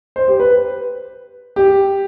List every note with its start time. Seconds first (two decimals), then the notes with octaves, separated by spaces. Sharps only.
0.16 C5
0.28 G4
0.40 B4
1.56 G4